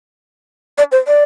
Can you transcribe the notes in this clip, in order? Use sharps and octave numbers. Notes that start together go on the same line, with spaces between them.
D5
C5
D5